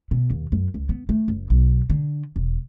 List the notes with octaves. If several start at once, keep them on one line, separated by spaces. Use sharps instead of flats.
B2
D#2
F#2
C#2
B3
A3
F#1
B1
D3
E1